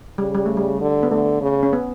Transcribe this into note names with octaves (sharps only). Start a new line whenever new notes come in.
C#3 G3
G3
A3
G3
D3
B3
D3 A3
C#3
C#4
B3